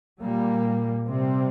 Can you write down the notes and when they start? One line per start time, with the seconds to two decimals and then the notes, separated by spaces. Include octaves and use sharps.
0.22 A#2 G3 A#3
1.07 C3 G3 C4